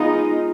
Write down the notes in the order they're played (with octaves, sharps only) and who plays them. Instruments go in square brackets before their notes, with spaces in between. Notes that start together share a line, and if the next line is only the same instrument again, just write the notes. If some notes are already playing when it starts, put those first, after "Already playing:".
Already playing: [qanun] G#3 B3 F4 A#4 [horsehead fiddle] D#4